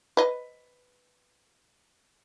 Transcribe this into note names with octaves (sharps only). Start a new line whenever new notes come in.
B4 D#5